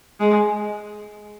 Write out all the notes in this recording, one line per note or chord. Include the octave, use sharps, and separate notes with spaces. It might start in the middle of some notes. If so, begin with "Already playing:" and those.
G#3